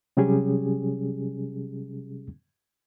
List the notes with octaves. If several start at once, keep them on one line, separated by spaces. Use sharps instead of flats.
C3 F#3 G3 C#4 G4 G#4